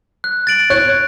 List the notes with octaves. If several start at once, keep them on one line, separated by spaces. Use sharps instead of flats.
F#6
A6 D7 F#7
C#5 F#6